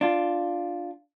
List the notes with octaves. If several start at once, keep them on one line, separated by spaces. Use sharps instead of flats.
D4 F4